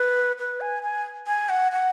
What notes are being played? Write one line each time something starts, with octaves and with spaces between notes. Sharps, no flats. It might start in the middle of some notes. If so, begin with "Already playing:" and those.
Already playing: B4
B4
G#5
G#5
G#5
F#5
F#5